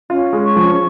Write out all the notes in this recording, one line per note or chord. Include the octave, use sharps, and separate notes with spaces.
C#4 F4
G#3
C#6
F3